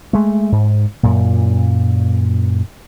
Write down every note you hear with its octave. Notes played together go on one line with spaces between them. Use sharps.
G#3 A3
G#2
F#2 A#2